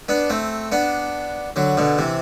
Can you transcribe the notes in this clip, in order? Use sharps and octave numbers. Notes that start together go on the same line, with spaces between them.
B3 D4
A3 C4
B3 D4
D3 F#3
B2 D3
C3 E3